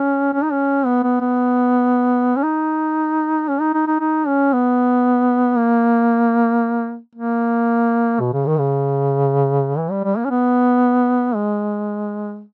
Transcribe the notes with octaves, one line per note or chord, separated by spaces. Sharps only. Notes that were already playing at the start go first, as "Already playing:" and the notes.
Already playing: C#4
C#4
D#4
C#4
B3
B3
B3
C#4
D#4
C#4
D#4
D#4
D#4
D#4
C#4
B3
A#3
A#3
B2
C#3
D#3
C#3
E3
G3
G3
A#3
C#4
B3
G#3